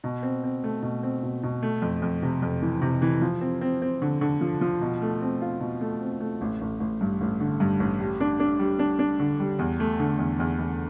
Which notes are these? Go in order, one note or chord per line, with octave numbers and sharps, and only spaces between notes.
B2
C4
C4
A3
B2
C4
B2
B2
A3
F2
F2
C3
F2
E3
C3
E3
F3
C4
C4
C4
D3
D3
F3
F3
B2
A3
C4
F4
B2
A3
C4
A3
A1
A1
A1
G2
A1
D3
G2
A1
G3
D4
D4
G3
D4
D4
D3
G3
E2
A3
D3
E2
E2
E2